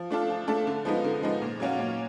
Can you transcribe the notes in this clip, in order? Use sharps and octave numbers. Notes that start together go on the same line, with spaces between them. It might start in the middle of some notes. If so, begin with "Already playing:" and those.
Already playing: F3
A3 D4 F4 A4
F3
A3 D4 F4 A4
D3
F3 G#3 B3 D#4
D3
F3 G#3 B3 D#4
A#2
F#3 A#3 C#4 F#4
A#2